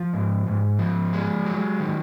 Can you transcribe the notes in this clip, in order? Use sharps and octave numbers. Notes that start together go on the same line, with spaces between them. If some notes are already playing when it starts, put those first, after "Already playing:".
Already playing: F3
G#2
G#2
F3
G#3
F#3
D#3